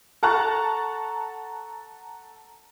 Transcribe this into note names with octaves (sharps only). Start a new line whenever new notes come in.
A4 F#5 A5 A#5 C#6 F#6